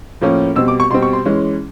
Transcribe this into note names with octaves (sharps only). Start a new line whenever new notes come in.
A2 F3 A#3 C#4
B2 G3 C4 E6
D6
C#6
B2 G3 C4 C6
C#6
C6
E3 G#3 C#4